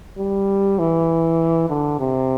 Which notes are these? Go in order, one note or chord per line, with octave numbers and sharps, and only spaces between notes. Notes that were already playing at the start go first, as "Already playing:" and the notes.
G3
E3
D3
C3